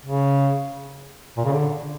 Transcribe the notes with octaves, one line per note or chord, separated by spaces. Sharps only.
C#3
A#2
C#3
D3